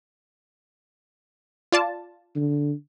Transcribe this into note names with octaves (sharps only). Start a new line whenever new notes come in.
F4 D5 A5
D3